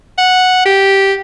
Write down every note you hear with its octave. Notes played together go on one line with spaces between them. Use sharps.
F#5
G4